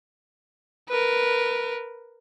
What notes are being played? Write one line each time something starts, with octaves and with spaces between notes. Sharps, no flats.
A#4 B4